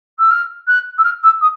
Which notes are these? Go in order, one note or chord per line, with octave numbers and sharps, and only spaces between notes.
E6
F6
F#6
E6
F6
E6
D#6